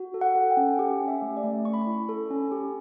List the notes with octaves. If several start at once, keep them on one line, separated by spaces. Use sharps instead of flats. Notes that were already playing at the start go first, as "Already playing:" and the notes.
Already playing: F#4
A4
F#5
A4
G5
C#4
G4 G5
C#4
E5
A3
D5
A3
C#4 C#6
B5
C#6
E4
A4
C#4
G4